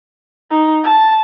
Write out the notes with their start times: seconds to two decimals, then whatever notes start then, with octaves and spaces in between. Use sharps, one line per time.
0.51 D#4
0.84 A5